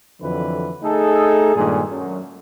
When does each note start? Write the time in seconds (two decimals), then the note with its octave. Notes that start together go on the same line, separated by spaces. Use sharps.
0.21 F2 D3 E3 F#3 B4
0.83 A3 D#4 G#4 A4
1.55 G2 A#2 D#3 G#3 G#4
1.90 F#2 F#3